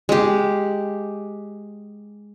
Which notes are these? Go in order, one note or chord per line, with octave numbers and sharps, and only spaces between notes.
G#3 G4